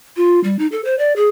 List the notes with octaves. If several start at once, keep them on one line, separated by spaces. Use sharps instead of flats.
F4
G3
D#4
A4
C5
D5
G#4